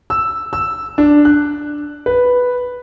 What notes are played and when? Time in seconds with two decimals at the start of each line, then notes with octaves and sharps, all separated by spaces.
0.10 E6
0.53 E6
0.98 D4
1.25 F#6
2.06 B4